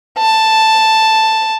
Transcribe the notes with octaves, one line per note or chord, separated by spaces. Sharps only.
A5